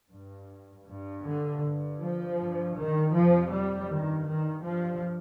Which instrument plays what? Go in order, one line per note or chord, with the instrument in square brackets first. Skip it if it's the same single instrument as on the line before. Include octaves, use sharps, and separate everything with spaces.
[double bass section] G2
G2
D3
G2
F3
G2
D#3
F2 C3 F3
G3
G2 D#3
D#3
G2 F3